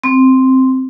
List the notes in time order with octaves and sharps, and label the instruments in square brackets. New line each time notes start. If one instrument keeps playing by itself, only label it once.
[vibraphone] C4